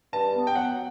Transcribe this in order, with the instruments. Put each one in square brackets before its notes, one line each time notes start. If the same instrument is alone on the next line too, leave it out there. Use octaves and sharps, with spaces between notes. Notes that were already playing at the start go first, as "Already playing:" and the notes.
[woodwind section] G2 [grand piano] A5
[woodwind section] B3
[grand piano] G5
[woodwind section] F#3 [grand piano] F#5